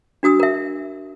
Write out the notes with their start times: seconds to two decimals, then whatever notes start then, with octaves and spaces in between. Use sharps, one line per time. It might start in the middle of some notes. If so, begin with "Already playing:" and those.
0.23 D4 F#4 D#6 E6
0.40 A#4 E5